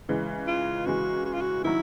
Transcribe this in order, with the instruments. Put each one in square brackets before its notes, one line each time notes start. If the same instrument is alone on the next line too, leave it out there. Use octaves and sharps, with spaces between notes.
[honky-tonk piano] C#3 E3 G#3
[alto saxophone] F4
[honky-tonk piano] C#3 E3 G#3 [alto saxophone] F#4
[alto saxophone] F#4
F4
F#4
[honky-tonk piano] D#3 F#3 [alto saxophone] E4